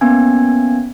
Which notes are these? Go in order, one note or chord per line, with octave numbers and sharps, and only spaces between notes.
A#3 B3 C#4 G#5 G#6